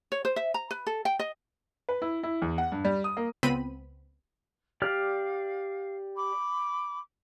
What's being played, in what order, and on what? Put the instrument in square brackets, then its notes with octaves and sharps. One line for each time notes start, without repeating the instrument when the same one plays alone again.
[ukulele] C#5
C5
E5
A#5
B4
A4
G5
D#5
[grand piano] B4
E4
E4
E2
F#5
G2
G3
D#6
A#3
[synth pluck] C#2 B3 C4 B5 D#7
[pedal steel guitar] G4 D5 F6 [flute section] F5
[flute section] B5 D6